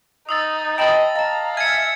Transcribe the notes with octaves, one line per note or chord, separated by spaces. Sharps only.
D#4 D#6 E6 A6
D#5 G5 A5 B5 D#6 A6
D#5 F5 A5 A#5
E5 G#5 F6 G#6 C#7